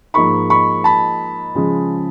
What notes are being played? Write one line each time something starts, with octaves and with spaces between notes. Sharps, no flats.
G#2 F3 A#3 D#4 B5 C#6
B5 C#6
A5 B5
C#3 F3 G#3